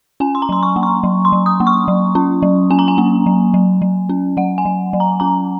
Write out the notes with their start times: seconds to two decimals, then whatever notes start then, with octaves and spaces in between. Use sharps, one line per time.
0.20 C#4 G#5
0.35 C6
0.42 A#5
0.49 F#3 C6
0.63 C#6
0.76 A#3
0.83 C#6
1.03 F#3
1.25 C6
1.32 F#3
1.46 D#6
1.60 A#3
1.67 C#6
1.88 F#3
2.15 C#4
2.42 F#3
2.70 C#4 G#5
2.79 A#5
2.88 G#5
2.98 A#3
3.26 F#3
3.54 F#3
3.82 F#3
4.09 C#4
4.37 F#3 F#5
4.58 G#5
4.65 F#3
4.93 F#3
5.00 A#5
5.20 C#4 A#5